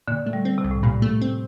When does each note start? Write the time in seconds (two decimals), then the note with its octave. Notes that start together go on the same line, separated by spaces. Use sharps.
0.08 A#2 D3
0.26 A3
0.33 G3
0.45 C4
0.58 C3
0.64 C2
0.71 A2
0.83 G2 A#2
1.02 A3
1.21 C4